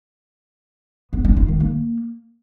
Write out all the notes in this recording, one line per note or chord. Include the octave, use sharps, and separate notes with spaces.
B3
C#4
F4
D#3
A#3